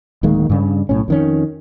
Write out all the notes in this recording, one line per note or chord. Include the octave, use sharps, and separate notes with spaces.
D1 D#3 G#3 A#3
G2 C#3
B1 A2 C#4
F2 D#3 C#4